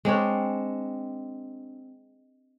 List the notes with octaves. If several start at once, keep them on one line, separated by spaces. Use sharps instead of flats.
G#3 C4 D4 C#5